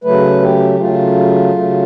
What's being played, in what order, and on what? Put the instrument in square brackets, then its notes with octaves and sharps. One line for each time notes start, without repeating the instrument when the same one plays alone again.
[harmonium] C#3 F#3 A3 B4
G4
C#3 F#3 A3 F4
C#3 F#3 A3